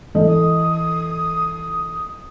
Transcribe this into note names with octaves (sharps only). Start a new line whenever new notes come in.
E3 A4 D#5
D#6